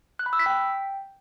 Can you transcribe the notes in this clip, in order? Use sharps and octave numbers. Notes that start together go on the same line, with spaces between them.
F#6
B5
E6
B6
G5